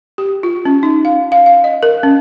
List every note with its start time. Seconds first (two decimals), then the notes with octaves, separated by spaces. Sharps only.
0.18 G4
0.43 F4
0.65 C#4
0.83 D#4
1.05 F5
1.32 F5
1.46 F5
1.64 D#5
1.83 A#4
2.03 C#4